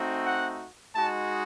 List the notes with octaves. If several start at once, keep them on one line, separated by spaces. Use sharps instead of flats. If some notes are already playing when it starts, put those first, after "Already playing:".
Already playing: A3 C4 D#4 F#4
F#5
G#3 D#4 F#4 A5